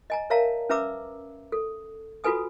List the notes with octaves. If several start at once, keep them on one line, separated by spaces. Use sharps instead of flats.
D#5 G#5 A#5
A#4 C#5 E5 F5 A5 A#5
C#4 B4 E5 A#5 D6 E6
A4
F4 F#4 A4 B4 G#5 D#6